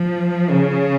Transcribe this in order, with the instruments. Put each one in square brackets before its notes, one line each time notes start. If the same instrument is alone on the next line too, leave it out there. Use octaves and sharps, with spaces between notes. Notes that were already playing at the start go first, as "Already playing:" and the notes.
Already playing: [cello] F3
C#3